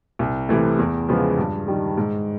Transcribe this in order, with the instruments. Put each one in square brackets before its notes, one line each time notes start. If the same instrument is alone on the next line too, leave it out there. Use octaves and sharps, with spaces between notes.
[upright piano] C2
C3 E3 A3
E2
C#3 F3 G#3 B3
G2
D#3 G3
G#2